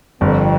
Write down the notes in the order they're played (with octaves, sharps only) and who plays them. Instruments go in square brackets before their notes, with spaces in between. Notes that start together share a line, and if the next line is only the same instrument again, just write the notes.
[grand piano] G1 [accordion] F2